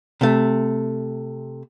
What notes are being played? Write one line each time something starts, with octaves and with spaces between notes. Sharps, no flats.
C3 A3